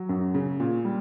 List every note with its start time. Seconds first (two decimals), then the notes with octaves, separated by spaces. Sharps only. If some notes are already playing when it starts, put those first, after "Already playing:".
Already playing: F#3
0.09 F#2
0.34 C#3
0.60 A#2
0.85 G3